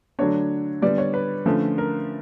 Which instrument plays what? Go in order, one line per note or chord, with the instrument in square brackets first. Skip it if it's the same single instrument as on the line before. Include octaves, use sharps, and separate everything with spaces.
[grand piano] D3 F#3 A3 D4 C#5
D3 G3 B3 D5
C#5
B4
D3 F3 A3 C#4
A#4